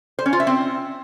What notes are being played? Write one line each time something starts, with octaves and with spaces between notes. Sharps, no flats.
C5
C#4
F4
E5
C4